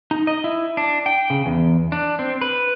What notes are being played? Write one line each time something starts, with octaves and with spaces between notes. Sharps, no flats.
D#4
D#5
E4
D4
G5
C#3
E2
D4
C4
B4